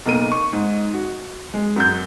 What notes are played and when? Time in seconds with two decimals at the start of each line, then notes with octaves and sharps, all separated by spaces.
0.05 B1 A#3 D#7
0.31 C#6
0.53 G#2
0.93 F#4
1.54 G#3
1.76 F#2 G6